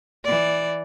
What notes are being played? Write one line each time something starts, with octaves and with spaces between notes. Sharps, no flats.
E3 D5